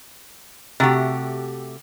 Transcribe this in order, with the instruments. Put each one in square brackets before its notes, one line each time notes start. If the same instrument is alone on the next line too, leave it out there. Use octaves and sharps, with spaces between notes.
[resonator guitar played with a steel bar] C3 A3 F#4 G4